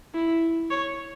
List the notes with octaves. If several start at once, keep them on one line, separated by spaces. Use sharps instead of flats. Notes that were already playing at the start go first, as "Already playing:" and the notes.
E4
C#5